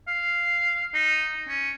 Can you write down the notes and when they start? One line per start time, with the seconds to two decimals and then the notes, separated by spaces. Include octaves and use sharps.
0.08 F5
0.94 D#4
1.49 C#4